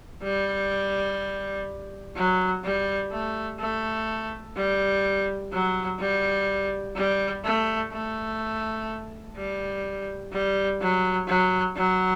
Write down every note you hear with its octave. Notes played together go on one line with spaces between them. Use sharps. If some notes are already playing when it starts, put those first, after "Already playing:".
G3
F#3
G3
A3
A3
G3
F#3
G3
G3
A3
A3
G3
G3
F#3
F#3
F#3